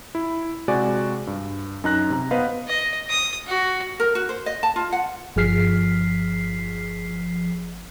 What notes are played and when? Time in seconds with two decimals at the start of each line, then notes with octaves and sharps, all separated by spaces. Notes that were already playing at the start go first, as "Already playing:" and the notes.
0.15 E4
0.68 C3 G#3 F#4 D5 G#5
1.27 G2
1.84 F#2 D#4 A#5 F#6 A#6
2.10 C3 A#5
2.31 B3 B4 C5 D#5 F5
2.68 D#5
3.09 D#6
3.47 F#4
4.00 A#4
4.15 F#4
4.29 C5
4.46 D#5
4.63 A5
4.76 F4
4.92 F#5
5.36 G1 F3 G#4 F6 B6 C7